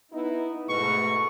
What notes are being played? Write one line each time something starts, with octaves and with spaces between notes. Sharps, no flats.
B3 D#4 E4
G#2 B2 A3 C#6